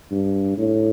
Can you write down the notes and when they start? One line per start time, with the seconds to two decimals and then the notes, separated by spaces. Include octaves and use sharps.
0.11 G2
0.58 A2